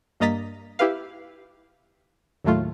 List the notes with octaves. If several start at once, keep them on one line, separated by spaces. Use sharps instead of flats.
G2 A#3 D#5 A#5 A6 B6
E4 G4 B4 F5
D#2 A2 F#3 A3 F4